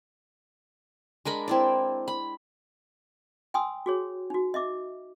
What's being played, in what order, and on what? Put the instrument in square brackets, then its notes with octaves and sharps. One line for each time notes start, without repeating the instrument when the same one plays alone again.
[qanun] G#3 D4 A#4 B5
C4 E4 D5
B5
[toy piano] G5 G#5 C6 D#6 E6
F#4 G#4 C#5
D#4 F#4
D#5 E5 D6